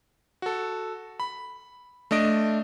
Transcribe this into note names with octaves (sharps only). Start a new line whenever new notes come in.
F#4 A4
B5
A3 D4 D#5 D7